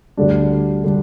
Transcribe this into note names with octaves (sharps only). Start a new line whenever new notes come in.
D2 D3 G3 D4
D3 G3 D4